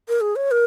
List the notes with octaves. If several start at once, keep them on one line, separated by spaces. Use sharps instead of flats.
A#4
G#4
C#5
A#4